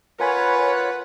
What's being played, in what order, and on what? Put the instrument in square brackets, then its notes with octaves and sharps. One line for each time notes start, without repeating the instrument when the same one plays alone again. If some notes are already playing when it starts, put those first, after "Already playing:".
[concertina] F4 F#5 [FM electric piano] A#4 G#5 B5 [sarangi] B4 [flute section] C#5